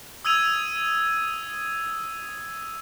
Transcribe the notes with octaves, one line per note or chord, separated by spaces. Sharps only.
D#6 E6 G#6 D#7 F7